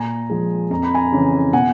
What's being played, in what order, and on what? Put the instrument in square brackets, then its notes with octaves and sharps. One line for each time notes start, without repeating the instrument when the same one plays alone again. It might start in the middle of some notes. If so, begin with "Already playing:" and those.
Already playing: [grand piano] A#2 G#5 A#5
F3 G#3
F2 A#5
B5
G#5 A#5
C#3 E3
B2 F#5 G#5